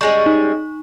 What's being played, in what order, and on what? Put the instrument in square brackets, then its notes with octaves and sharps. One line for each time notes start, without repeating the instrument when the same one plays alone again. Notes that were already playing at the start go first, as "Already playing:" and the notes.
[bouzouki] G3 G#3 C#4 [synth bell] C#6
[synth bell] D#4